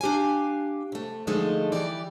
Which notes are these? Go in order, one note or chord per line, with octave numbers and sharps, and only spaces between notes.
D4 G4 F5 G#5
C3 A3
D3 F3 G#3 A3 D#4
E3 G3 G4 D5